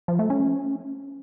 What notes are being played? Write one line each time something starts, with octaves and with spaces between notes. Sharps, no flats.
F3
A3
C#4